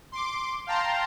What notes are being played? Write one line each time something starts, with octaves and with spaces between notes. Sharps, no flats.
C6 D6
F5 G5 A5 A#5 C6